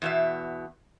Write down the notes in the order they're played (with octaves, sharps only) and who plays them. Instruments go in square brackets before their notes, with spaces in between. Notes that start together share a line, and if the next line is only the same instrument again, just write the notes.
[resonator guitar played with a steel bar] E2 B2 E5